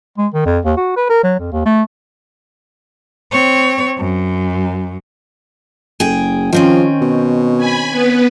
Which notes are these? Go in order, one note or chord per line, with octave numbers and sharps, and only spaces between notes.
G#3
D#3
F2
D#2
F#4
B4
A#4
F#3
F2
D#2
A3
C4 C#5
F#2
F#1 G#4 G5
D#3 F3 C4 C#4
B2
G#5 B5
B3 B4